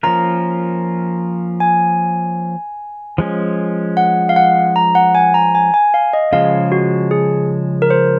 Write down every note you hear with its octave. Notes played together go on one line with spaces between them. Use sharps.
F3 A#3 C#4 F4 A#4 A#5
G#5
F3 G#3 C#4
F#5
F5
F#5
A#5
F#5
G#5
A#5
G#5
G#5
F5
D#5
C#3 F3 G#3 F5
F#4
G#4
A#4
C5